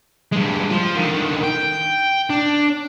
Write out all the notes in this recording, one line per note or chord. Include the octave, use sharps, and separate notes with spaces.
G2 G#3
F3 F4
D3 D#3
G5
D4